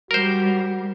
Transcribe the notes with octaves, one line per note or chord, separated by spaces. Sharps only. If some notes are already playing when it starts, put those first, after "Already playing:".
G3 F#4 A#4 C5